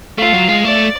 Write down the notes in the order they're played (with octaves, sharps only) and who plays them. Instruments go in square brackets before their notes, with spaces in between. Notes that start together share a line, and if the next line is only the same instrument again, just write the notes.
[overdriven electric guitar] A3 [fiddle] F4
[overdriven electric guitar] F#3
G#3
[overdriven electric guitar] A3 [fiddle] D5